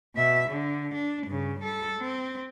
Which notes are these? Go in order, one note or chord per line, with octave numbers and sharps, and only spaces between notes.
B2 E5
D3
D4
G2 C#3
G3 A4
C4